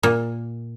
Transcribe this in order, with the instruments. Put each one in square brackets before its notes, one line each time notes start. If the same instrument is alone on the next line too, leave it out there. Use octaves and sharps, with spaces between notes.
[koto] A#2